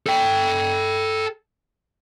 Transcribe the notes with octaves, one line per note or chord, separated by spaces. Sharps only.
A4 G5